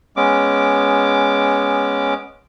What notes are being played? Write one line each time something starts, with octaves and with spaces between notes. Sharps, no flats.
G#3 B3 C#4 D6